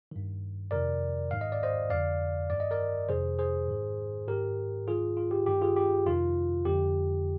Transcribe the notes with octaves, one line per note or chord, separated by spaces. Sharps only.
G2 D#3
F2 C3 D#3 A#4 D5
G#2 D#3 F5
D#5
D5
C5 D#5
F2 D3 D5 F5
G2 D#3 D5
D#5
A#4 D5
F2 C3 D#3 G#4 C5
G#4 C5
G#2 D#3
G#2 D#3 G4 A#4
G#2 D#3 F4 G#4
F4
G4
G2 D#3 G4
F4 G#4
G4
F2 C3 D#3 F4
F2 D3 G4